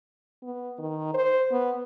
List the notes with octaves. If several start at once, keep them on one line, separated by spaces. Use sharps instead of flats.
B3
D#3
C5
B3